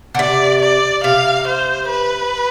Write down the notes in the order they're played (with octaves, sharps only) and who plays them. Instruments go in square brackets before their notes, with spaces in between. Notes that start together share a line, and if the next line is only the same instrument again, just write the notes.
[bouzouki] D3
[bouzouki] C3 [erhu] D5
[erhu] D5
[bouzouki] C3 [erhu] F5
[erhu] C5
B4